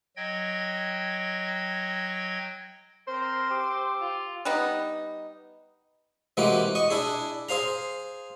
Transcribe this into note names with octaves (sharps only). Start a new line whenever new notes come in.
F#3 D#5 G5 G#6
C4 A#4 C5
G4 D6 E6
F4
G3 B3 D#4
C3 E3 G#3 A#3 F#4 D6
D#5 C#6
D4 E4 G#4
G#4 C5 F5 A#5